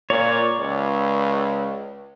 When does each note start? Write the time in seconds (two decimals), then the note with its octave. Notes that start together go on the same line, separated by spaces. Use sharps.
0.10 A#2 C#5 D5
0.59 C#2